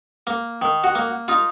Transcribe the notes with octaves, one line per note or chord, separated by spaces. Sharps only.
A#3
D#3
F#4
A#3
D#4 F4